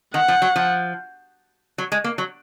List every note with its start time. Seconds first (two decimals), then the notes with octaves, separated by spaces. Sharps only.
0.14 D#3 F#5
0.28 F3
0.42 F#3
0.56 F3
1.78 F#3
1.92 G#3
2.04 A#3
2.18 F#3